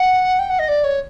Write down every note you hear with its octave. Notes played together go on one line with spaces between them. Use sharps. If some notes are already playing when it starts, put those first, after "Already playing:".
Already playing: F#5
G5
F#5
D#5
D5
C#5